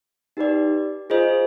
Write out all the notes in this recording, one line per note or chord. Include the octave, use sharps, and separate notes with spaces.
D#4 G4 B4 D5
F4 G#4 C5 D#5